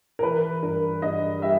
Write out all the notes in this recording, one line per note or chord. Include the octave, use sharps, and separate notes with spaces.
A#4
E3 B4
G2 A#4
G2 D#5
G3 E5